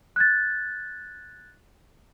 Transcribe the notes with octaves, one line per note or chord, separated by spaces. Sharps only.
F#6 G#6 A6